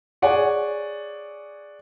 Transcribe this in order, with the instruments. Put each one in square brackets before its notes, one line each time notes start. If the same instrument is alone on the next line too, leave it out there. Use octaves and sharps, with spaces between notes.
[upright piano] G#4 C#5 D5 F#5 G#5